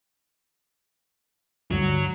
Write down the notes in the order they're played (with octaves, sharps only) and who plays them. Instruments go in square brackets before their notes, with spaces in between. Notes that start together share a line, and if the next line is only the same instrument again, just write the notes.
[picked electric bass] D2 G2 G3 [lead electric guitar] F#3